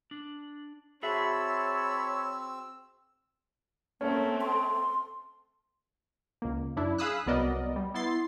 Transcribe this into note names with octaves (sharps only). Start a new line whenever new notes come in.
D4
C4 F#4 G#4 C#5 E5 A5 B5 E6
A3 A#3 C4 C#4
C6
C#2 A#3
F#2 D4 E4
G#4 F5 B5 D#6 E6 F#6
C2 F#3 B3 A#4 D5 D#5
G3
B3 E4 C6 A6 C7